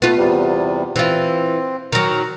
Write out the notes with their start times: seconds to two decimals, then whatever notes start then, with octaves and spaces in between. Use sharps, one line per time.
0.02 A3 B3 F4
0.17 E2 C3 G3
0.96 E3 C4 F4
1.92 D#3 F#3 A#5 F6